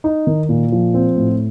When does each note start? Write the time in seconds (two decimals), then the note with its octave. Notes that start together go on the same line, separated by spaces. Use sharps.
0.04 D#4
0.27 D#3
0.49 A#2
0.72 F3
0.94 C4
1.17 A2